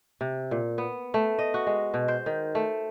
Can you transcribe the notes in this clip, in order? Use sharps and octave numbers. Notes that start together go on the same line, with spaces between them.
C3
A#2
B3
A3
D#5
F#4
G#3
B2
C5
D#3
A3